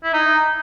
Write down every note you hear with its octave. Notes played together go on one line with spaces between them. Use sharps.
E4
D#4